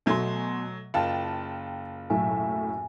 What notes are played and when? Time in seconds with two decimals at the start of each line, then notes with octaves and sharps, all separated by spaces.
0.06 B2 F#3 A3 G#5 C6
0.94 F#1 F4 G5 A5
2.10 B1 A2 E5 G#5